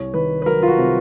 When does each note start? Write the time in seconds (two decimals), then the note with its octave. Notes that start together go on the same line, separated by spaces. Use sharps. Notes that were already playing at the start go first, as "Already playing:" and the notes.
Already playing: C2 C#5
0.14 D#3 B4
0.42 B4
0.46 F#3 A#4
0.62 F4
0.68 F#4
0.79 C3